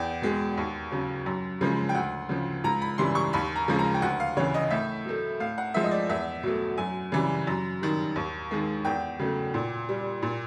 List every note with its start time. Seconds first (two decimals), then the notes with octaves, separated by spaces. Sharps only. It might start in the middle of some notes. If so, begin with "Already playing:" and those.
Already playing: E2 G5
0.22 B2 G#3
0.57 D#2
0.91 C#3 F#3
1.26 F#2
1.61 C#3 F3 G#3
1.89 G5
1.95 D2 F#5
2.29 C#3 F3
2.64 C#2 A#5
2.82 B5
2.98 C#3 E3 G3 C6
3.15 C#6
3.33 D#2 B5
3.56 A#5
3.68 C#3 F3 G#3
3.79 A#5
3.94 G5
4.02 D2 F#5
4.20 F5
4.37 C#3 E3 C#5
4.54 D#5
4.70 A2 E5
5.05 F#3 A3
5.40 A2 F5
5.58 F#5
5.74 F3 G#3 E5
5.83 D#5
5.91 D5
6.09 E2 E5
6.43 B2 F#3 A3
6.78 F#2 G#5
7.12 C#3 E3 G3
7.47 F#2
7.82 D#3 G3
8.16 D#2
8.51 D#3 G#3
8.85 E2 G5
9.19 C#3 F#3 A3
9.54 A#2
9.89 G3
10.22 A#2